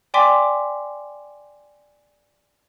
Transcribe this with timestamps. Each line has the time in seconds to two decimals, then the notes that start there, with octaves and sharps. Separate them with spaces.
0.14 D5 G5 G#5 C6 D6 B6